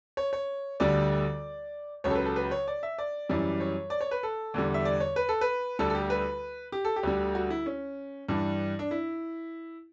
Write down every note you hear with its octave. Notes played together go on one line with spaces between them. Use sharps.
C#5
C#5
D2 D3 G3 D5
C#2 C#3 F#3 C#5
A4
B4
A4
B4
C#5
D5
E5
D5
F#2 E3 G3
C#5
D5
C#5
B4
A4
E2 D3 G3
E5
D5
C#5
B4
A4
B4
D2 D3 G3 A4
A4
G4
B4
G4
A4
G4
D2 D3 G3
F#4
E4
C#4
G2 E3 G3 D4
D4
E4